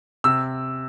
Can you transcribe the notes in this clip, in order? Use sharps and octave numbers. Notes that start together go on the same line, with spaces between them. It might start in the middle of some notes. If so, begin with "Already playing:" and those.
C3 E6